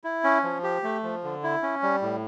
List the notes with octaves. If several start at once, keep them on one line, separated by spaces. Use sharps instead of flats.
E4
C#4
F3
G4
A3
F3
D3
E4
C#4
G3
A2